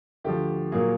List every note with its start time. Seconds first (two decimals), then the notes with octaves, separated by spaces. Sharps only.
0.24 D2 D3 F3 G4
0.72 A#2 F#3 A#3 G#4